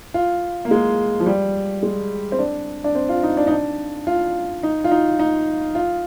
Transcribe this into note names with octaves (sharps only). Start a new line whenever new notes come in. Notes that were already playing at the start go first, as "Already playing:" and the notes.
F4
A#3
G#3
F3
G3
G#3
C4
D4
D4
C4
F4
D#4
D4
D#4
D4
F4
D#4
F4
D#4
D#4
F4